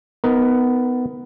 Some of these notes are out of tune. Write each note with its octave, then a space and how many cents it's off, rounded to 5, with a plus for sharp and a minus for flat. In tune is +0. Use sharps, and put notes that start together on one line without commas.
B3 +15 D#4 +15 A#4 +0